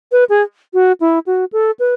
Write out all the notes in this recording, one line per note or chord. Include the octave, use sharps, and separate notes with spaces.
B4
G#4
F#4
E4
F#4
A4
B4